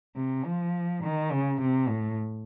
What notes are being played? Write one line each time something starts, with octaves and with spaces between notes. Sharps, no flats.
C3
F3
D#3
C#3
C3
A2